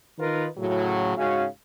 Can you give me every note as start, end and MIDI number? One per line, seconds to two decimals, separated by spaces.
0.19 0.46 51
0.19 0.46 63
0.19 0.46 65
0.19 0.46 70
0.19 0.46 71
0.56 1.14 45
0.56 1.14 49
0.56 1.14 54
1.16 1.45 44
1.16 1.45 49
1.16 1.45 56
1.16 1.45 61
1.16 1.45 66
1.16 1.45 77